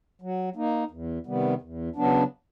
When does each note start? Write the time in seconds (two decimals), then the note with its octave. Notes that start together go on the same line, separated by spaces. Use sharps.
0.22 F#3
0.56 A#3 D#4
0.91 E2
1.26 C3 D#3 G3 B3
1.61 E2
1.96 C#3 F#3 B3 D4